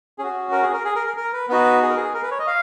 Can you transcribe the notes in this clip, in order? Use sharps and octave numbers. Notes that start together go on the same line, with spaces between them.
C#4 F#4 G#4
A#4
G#4
A#4
G#4
A#4
A#4
A#4
B4
B3 D#4 F#4 B4
G#4
A#4
G#4
A#4
B4
C#5
D#5
F5